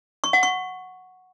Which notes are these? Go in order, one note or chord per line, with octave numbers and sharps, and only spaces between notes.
C#6
F#5
C#6